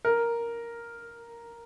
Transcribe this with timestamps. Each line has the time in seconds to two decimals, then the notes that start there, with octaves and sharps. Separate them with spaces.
0.05 A#4